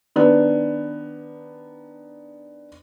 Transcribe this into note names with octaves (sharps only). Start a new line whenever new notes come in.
D#3 B3 D4